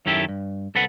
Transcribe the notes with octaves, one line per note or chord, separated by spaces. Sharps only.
F#2 D#3 E4 G4 A4
G2
C2 A4 B4 F#5